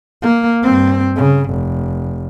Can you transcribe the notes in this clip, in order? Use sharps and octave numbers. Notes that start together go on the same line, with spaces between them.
A#3
G2 C4
C#3
F1